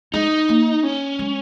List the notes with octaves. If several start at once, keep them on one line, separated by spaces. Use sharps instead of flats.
G#3 D#4
A#3
C#4
G#3